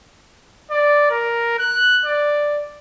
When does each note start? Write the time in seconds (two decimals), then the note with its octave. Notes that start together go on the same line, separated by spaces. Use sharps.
0.71 D5
1.11 A#4
1.59 F#6
2.06 D5